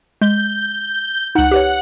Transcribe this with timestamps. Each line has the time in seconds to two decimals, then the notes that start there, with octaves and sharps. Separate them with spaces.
0.21 G#3 G6
1.35 C#2 D#4 F#5
1.51 G4 B4 C#5